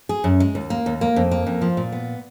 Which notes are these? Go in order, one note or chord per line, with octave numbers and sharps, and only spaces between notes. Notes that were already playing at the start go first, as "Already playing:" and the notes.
G#4
F#2
G#3
D#2
A#3
D#2
A#3
F2
A#3
F2
F3
A#2
B3